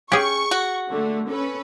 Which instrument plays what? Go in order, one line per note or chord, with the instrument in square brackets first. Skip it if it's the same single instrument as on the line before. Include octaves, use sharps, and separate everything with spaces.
[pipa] C#4 [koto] G4 G#4 [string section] C#6
[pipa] F#4
[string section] D3 A3
C#4 A4 B4